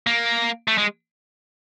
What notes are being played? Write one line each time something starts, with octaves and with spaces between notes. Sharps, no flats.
A#3
A3
G#3